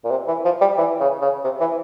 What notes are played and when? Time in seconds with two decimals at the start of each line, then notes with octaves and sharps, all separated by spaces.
0.05 A#2
0.11 C3
0.28 E3
0.45 F3
0.61 G3
0.78 E3
1.00 C#3
1.22 C#3
1.44 C3
1.60 E3